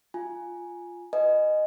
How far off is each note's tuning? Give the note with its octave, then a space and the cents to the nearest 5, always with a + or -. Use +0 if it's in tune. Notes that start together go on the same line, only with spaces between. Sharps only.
F4 +0 G#5 +0
B4 +15 D#5 -15 G#5 +0